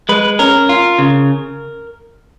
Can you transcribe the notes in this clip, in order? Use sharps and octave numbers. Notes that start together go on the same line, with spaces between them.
G#3 B4
C#4 A#4
F4
C#3